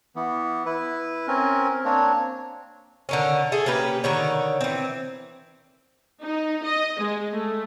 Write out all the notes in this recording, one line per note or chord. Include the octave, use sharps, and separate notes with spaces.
E3 B3
E4 B4
C4 C#4 A#4
A#3 C4 D4 C#5
D3 D#3 C#4
G#4 A4 E5
A#3 C#4 G4 B4
D3 D#3 C#5
E3 C4
D#4
D#5
G#3
A3